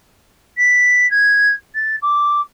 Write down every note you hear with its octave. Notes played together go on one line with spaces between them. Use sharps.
B6
G#6
A6
D6